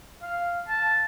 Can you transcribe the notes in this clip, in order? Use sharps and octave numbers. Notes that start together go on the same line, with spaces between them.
F5
A5